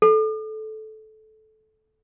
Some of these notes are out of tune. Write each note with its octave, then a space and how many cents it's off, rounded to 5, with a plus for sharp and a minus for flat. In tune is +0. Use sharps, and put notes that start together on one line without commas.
A4 -15